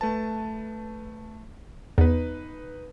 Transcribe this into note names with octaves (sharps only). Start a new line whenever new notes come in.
A3 B4 A5
E2 D#4 B4